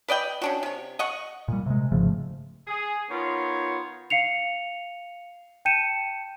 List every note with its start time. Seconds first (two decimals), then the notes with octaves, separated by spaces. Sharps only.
0.08 B4 D5 D#5 G5
0.42 C#4 D4 F#4
0.63 C3 C#5
0.99 D#5 F#5 C#6
1.48 A#2 G3
1.66 C3 G#3
1.92 G#1 C#3 F3 A3
2.67 G#4
3.09 D#3 B3 F4 C#5
4.10 F5 C7 C#7 F7
5.65 G5 A5 G6 C#7 D#7 E7